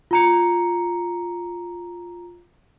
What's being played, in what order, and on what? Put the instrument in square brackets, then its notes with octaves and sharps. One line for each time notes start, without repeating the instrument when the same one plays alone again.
[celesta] F4 A#5 C#7